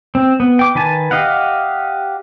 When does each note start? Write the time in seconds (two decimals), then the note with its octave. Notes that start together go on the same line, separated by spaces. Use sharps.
0.15 C4
0.40 B3
0.59 G5 D6
0.75 D#3 B4 G#5 A5
1.11 G4 D#5 F5 F#5